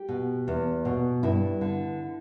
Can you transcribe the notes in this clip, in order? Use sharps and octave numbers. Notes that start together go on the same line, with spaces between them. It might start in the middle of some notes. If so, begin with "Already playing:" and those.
Already playing: G4
B2
E2
B2
G2 E4
D3